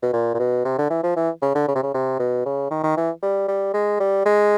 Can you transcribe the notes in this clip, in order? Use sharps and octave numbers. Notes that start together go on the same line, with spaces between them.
B2
A#2
A#2
B2
C3
D3
E3
F3
E3
C#3
D3
C#3
C3
C#3
C3
B2
C#3
D#3
D#3
E3
G3
G3
G#3
G3
G#3